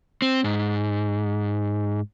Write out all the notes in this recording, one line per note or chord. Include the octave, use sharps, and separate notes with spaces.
C4
G#2